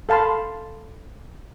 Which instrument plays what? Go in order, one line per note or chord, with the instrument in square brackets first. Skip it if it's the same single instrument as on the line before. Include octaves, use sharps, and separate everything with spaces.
[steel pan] A4 F5 A5 B5 C6